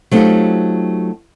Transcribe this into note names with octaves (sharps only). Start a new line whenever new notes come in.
F#3 A3 C4 D#4 F4 G4